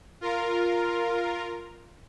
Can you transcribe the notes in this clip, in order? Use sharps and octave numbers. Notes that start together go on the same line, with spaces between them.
F4 A#4